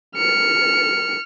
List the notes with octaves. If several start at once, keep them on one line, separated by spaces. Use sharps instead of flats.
F6 C#7